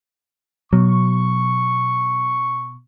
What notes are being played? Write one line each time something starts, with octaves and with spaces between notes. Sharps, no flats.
B2 F#3 C#6